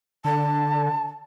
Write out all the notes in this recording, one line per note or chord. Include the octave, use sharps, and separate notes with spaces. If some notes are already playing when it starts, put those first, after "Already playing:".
D3 A5